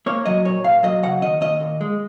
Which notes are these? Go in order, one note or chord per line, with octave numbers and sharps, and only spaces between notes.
A#3 C#5
F#3 D#5
A#2 C#5
A#2 F5
F#3 D#5
C#3 F#5
D#2 D#5
D#2 D#5
A#2
G#3